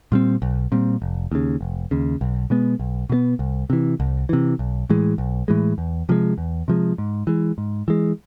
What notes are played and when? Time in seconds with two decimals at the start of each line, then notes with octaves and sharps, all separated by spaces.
0.12 A#2 G3 C4
0.42 B1
0.72 A#2 G3 C4
1.02 F1
1.32 D#2 C#3
1.61 F1
1.91 D#2 C#3
2.21 B1
2.50 B2 G#3 B3
2.80 B1
3.10 B2 G#3 B3
3.39 C2
3.70 C3 E3
4.00 C2
4.29 C3 E3
4.59 B1
4.90 A2 E3 G#3
5.18 B1
5.48 A2 E3 G#3
5.78 E2
6.09 C3 F3 G#3
6.38 E2
6.68 C3 F3 G#3
6.98 G#2
7.27 E3 G#3
7.58 G#2
7.88 E3 G#3